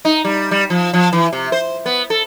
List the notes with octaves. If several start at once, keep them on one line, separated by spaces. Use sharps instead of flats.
D#4
G3
G3
F3
F3
E3
C3
C5
B3
A4